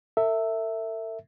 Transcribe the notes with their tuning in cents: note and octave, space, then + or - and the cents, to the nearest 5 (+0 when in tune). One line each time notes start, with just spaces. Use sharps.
A4 +45 E5 +0